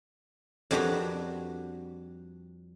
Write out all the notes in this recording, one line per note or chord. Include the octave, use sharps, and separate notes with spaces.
F2 G3 D4 F#4 B4 A#5